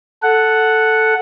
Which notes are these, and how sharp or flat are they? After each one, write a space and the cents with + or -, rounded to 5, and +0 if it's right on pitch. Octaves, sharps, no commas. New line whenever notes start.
A4 +0 F#5 +0